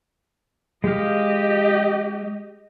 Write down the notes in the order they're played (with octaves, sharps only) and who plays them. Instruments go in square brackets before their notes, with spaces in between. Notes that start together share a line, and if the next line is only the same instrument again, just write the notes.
[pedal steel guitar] G#3 F5 [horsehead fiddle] G4 D#5